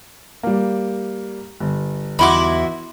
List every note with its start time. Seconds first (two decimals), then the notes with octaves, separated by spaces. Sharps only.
0.43 G3 A#3
1.60 G1
2.19 E2 D#4 E4 F#4 B5 C6 D6